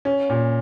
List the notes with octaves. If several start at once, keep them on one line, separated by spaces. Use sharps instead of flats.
C#4
A#2